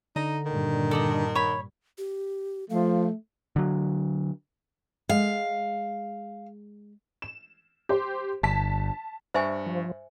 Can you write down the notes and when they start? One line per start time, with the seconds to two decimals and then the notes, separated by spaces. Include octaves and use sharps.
0.16 D3 D#4 A#5
0.46 G2 A#2 D#3
0.91 A4 D5 D#5
1.35 C#5 B5
1.98 G4
2.70 F3 A3 F5
3.56 D3 F#3
5.09 G#3 F5
7.22 E7
7.89 G4 C5
8.43 G1 A5 B6
9.34 G2 C5 E5 G#5 C#6
9.66 F3